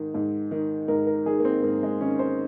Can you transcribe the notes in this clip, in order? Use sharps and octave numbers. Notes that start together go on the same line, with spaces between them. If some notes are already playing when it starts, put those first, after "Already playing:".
Already playing: G#2 D#3
G#2
D#3
G#2 A#4
A#4
D#3 G#4
A#3
C4
G#2 A#3
G#3
D#3 C#4
C5